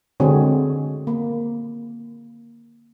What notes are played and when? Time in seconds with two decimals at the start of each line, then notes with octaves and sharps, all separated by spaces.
0.20 D3 G#3 C4 F#4 G#4 C#5
1.07 A#3